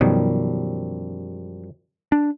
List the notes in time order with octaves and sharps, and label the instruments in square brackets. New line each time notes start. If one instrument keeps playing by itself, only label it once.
[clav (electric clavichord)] F#2 F3 G3 [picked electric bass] B2 D#3
[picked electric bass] D4